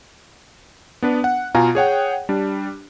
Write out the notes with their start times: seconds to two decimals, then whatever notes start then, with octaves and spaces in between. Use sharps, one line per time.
1.02 B3 D4 B4
1.24 F#5
1.55 B2 F4 F5 G#5 A#5
1.75 G#4 C#5 F#5 G5
2.29 G3 D4